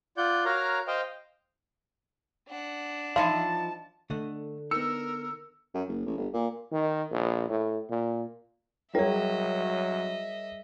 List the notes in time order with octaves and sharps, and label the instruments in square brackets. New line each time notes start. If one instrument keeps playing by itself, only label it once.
[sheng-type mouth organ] F4 D5 F#5 G6
F#4 A#4 C#5 F5 A#5
C5 D#5 F5 G5
[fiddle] D4 F#5
[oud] F3 D#4 E4 [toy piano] F5 C6 [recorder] A5
[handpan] D3 [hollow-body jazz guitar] A3 D#5 F#5
[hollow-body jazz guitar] B3 D#4 [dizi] A#4 [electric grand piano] E6 C#7
[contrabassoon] F#2
F#1
A1
G1
A#2
[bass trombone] D#3
A#1
A2
A#2
[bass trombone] F#3 [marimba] G3 G#4 [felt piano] A#4 C#5 [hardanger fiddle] D#5 E5